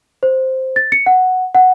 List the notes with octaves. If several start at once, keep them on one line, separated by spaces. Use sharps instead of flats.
C5
A6
C#7
F#5
F#5